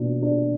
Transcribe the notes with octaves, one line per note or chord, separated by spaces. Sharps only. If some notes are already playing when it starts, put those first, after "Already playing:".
Already playing: B2 D4
D4